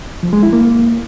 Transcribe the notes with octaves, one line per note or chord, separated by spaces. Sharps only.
F3
G#3
E4
A#3